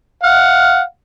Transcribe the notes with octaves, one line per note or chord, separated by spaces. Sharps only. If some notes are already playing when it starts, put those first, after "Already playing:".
F5 F#5